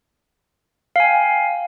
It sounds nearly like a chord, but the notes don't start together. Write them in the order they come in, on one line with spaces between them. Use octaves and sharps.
F5 G#5 G5